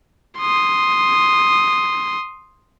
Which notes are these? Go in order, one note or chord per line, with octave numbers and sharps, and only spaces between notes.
C6 D#6